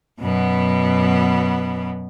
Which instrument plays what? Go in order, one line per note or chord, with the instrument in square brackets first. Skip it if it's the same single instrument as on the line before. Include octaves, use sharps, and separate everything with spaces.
[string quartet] F#2 B2 B3